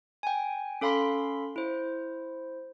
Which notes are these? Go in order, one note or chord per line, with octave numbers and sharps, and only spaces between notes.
G5 G#5
C#4 A4 F5 B5 C6 B6
E4 C5